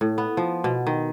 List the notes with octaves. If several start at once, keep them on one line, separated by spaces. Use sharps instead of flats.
A2
B3
F3
B2
D#3